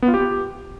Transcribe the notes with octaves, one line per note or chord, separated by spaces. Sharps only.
B3
F4
G4